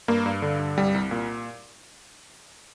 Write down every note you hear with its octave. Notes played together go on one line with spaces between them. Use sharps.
G2 A#3
G2
D3
G2
C2 G3
C2
A#2